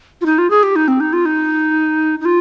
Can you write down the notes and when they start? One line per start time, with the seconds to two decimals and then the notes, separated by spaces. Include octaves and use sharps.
0.21 F4
0.26 D#4
0.38 F4
0.50 G#4
0.63 G4
0.76 D#4
0.88 C4
1.00 D#4
1.13 F4
1.26 D#4
2.21 D#4
2.25 F4